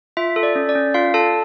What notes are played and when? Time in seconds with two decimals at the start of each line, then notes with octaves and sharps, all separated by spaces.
0.17 F4 E5
0.36 A4
0.43 D5
0.55 C#4
0.69 D5
0.75 C#4
0.94 F4 F5
1.14 A4 A5